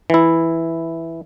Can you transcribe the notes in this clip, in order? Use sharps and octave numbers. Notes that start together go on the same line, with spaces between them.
E3 E4